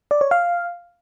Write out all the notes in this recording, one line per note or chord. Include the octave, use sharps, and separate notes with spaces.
D5
C#5
F5